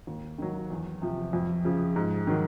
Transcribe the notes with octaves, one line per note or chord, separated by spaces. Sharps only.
D#2
D#3 F#3
E2
C3 F3
F2
C#3 F3
G#2
D#3 F#3